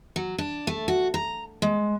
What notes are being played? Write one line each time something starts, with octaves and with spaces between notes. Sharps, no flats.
F#3
D4
A3
F#4
A#5
G#3